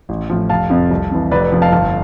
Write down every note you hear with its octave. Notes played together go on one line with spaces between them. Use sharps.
A1
A2 F3
F1 F5 A5
F2 C3 F3
C2
C3 E3
F1 B4 D5
B4
F2 C3 F3
F5 A5
G1 F5 A5